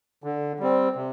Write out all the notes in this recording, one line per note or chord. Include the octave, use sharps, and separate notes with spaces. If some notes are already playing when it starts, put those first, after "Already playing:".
D3
G3 C4
C3